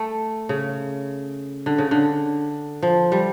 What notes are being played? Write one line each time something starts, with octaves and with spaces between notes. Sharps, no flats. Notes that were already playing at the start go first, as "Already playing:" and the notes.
Already playing: A3
C#3
D3
C#3
D3
F3
G3